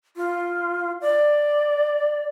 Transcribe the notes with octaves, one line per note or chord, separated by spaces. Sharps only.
F4
D5